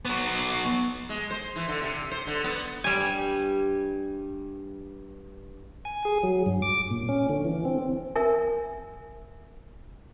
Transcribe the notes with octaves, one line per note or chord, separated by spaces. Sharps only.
F#3 B3
G#3
C5
E3
D3
C3
C5
D3
B3
G2 G3 G#5
G#5
G#4
F#3
G2
D6
A#2
C#4
D3
E3
C4
A#4 E5 G#5